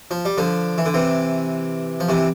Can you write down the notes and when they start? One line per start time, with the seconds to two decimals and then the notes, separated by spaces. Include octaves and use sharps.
0.11 F3
0.25 G3
0.38 D3 F3
0.78 E3
0.86 D3
0.94 C3 E3
2.00 F3
2.09 C3 E3